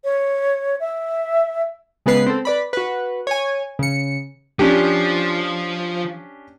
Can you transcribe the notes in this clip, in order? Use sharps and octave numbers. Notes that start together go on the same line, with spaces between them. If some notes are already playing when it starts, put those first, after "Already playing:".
C#5
E5
C#3 G#3 B3 B4 C7
C4 A4
B4 D5 B5
F#4 B4
C#5 G#5
C#3 C#7
F3 C#4 D4 G4